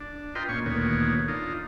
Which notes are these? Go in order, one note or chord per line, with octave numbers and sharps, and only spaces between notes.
D4
F4 B4 D#5 G5 A#5 C6
A#2 C#4 C#6
D2 A#2 D#3 B3 C#5
D4 D#4 F4